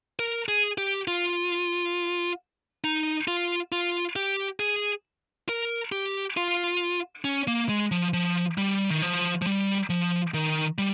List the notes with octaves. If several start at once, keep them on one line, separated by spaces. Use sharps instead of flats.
A#4
G#4
G4
F4
D#4
F4
F4
G4
G#4
A#4
G4
F4
C#4
A#3
G#3
F3
F3
G3
D#3
F3
F3
G3
F3
D#3
G3